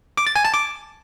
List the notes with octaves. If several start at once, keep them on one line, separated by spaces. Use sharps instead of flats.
D6
A6
G#5
A5
D6